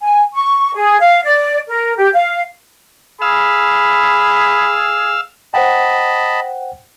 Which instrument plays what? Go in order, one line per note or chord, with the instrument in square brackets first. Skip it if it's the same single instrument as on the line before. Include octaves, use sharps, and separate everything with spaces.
[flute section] G#5
C#6
G#4
F5
D5
A#4
G4
F5
[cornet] G#4 [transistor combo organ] F5 E6 [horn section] B5
[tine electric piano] C5 F#5 G5 [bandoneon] D#5 A5 B5